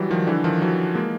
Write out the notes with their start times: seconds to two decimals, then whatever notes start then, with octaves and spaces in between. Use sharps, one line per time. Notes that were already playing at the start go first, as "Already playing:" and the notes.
Already playing: E3 F#3 G3
0.10 D#3 F3
0.27 D3 E3
0.44 D#3 F3
0.62 E3 F#3
0.95 G#3 A#3